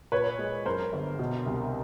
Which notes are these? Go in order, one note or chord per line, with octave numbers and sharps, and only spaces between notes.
A#2 B4 C#5
G#3
F#2 A#4 C5
G1
B2
C2